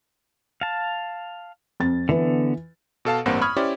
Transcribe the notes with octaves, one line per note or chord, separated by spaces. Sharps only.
F5 A5
F2 A6
D3 E3 B3 B4
B2 A4 F5 A5
A1 G2 A#3 C4 F#5
B5 C#6 D#6 F6 G#6
C#4 E4 G4 C5 D5